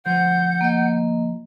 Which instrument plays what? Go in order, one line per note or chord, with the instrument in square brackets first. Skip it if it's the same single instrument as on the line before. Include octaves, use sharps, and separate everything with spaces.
[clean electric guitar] D2 F3 C5 [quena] F#5 [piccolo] G6
[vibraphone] A#3 D#5